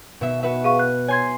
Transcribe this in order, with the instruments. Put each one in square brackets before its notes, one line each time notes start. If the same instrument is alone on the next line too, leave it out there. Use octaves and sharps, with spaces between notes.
[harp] B2 E5
F#4 B4 E5
[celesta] G#4 F5 C#6 [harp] D#7
[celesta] F#6
[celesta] C#5 G#6 [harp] G#5 C6